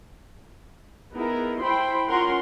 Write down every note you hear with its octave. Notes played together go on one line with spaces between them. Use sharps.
B3 D#4 E4 G#4 A#4
E4 C5 G5 B5 C6
C#4 F4 A#4 F#5 C6